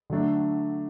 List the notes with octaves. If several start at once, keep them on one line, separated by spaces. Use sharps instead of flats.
D3 F#3 A3 D4